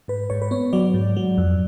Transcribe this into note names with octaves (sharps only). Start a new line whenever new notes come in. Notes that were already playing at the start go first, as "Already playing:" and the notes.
G#2 B4
G#2 C#5
B4
B3 C#5
F#3 D5
G#2
F#3
F2